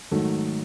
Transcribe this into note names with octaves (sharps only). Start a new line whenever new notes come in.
G#2 D#3 F#3 A3